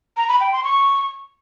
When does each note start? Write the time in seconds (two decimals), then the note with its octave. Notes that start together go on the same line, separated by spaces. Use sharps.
0.17 A#5
0.29 B5
0.40 G5
0.52 C6
0.64 C#6